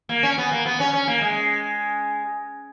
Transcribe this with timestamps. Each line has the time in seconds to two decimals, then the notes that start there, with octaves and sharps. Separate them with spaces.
0.09 A#3
0.23 C#4
0.38 B3
0.52 A#3
0.66 B3
0.80 C#4
0.93 C#4
1.07 A#3
1.21 G#3